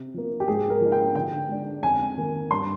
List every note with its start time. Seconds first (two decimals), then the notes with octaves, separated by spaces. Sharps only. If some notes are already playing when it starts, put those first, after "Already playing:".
Already playing: C3
0.14 F3 A#3
0.40 G4
0.48 G#2 G#4
0.70 A#4
0.81 F3 A#3 D#4
0.92 G5
1.15 D3 G5
1.49 G#3 D4
1.83 F2 G#5
2.17 D#3 A#3
2.51 G2 C6